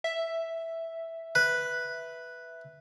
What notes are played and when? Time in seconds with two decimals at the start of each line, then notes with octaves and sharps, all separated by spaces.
0.04 E5
1.35 B4